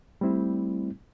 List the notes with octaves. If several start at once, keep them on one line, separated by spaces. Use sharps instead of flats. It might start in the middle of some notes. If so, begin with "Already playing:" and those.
G3 A3 C4 E4